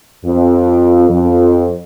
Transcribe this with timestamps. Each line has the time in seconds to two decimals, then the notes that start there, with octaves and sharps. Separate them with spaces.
0.24 F2
1.09 F2